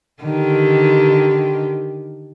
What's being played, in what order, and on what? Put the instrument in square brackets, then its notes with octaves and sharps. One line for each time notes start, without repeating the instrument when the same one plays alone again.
[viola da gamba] D3 D#3 G4